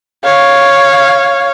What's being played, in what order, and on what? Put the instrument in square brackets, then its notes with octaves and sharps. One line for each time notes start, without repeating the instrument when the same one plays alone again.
[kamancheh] C#5 F5